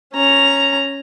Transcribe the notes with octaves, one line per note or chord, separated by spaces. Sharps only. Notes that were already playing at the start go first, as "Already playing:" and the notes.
C#4 A#5